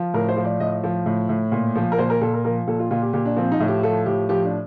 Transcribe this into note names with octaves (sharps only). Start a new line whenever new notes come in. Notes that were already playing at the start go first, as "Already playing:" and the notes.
Already playing: F3
A2 A#4
C5
F3
D5
A2 D#5
F3
A2
A2
A#2
F3
A#4
A#2 C5
A#4
A#2 A4
A#4
F3 A#4
A#2 A4
F4
A#2 F4
G4
A#2 G4
D4
F3 C4
D#4
A2
G4
F3 A4
A2 G4
F3 G4
D4